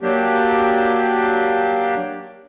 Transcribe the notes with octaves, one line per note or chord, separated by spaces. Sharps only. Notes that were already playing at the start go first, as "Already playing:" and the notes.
F#3 A#3 D4 G4